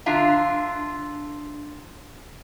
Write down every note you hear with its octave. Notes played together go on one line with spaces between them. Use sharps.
D3 D4 F4 E5 A#5